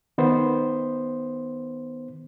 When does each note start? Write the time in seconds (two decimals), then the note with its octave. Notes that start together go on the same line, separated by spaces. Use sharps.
0.18 D#3 B3 C5